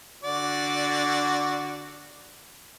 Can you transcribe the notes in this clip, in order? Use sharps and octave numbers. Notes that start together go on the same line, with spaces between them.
D3 F#4 D5